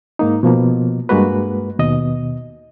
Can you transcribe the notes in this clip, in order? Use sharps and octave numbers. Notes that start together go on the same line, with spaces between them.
G#2 A#3 D#4
B2 F3 A#3
G2 G#3 A#3 F#4 B4
D#2 B2 D#5